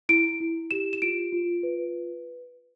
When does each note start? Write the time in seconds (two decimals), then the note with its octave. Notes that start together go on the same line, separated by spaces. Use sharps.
0.09 E4 D7
0.40 E4
0.71 G4 E7
0.93 E7
1.02 F4 D7
1.33 F4
1.63 B4